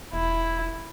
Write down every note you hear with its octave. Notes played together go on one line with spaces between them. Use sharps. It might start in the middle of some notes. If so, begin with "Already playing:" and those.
E1 E4